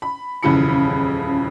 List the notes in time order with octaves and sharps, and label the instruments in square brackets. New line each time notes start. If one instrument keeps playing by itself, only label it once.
[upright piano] B5
D#1 F2 C#3 E3 B5 C#7